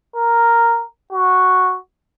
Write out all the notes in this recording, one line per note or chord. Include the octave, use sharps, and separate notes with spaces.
A#4
F#4